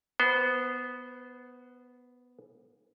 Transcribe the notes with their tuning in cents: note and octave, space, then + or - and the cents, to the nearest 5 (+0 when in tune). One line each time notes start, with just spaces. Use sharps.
B3 +0 C5 -25